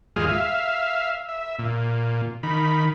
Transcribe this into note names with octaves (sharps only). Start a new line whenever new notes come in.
D#2 G#2 G#3 F4 G#4 F6
E5 F5
E5
A#2
D#3 B5